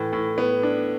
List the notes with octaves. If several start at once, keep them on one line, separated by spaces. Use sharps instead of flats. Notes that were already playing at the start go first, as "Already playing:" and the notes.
Already playing: A2 E3
A2
B3
D4